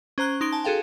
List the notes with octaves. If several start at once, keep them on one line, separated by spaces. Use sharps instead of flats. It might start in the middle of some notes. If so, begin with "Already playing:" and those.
C#4 C5 A#5 F#6 G7
D#4 C6 D7 G7
G#5 A5
F#4 G#4 A4 F5 G5